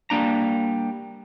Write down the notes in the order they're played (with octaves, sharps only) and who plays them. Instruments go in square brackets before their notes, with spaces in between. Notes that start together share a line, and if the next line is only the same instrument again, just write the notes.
[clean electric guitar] G3 A#3 D4 A#5